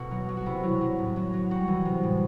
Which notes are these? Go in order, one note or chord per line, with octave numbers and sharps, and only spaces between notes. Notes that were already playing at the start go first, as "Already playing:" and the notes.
Already playing: B2 F#4 A4
F#3
F#3
F#4
C3 E4
F#3
F#3
A2
F#3
F#3
G3 F#4
E3
C3
A2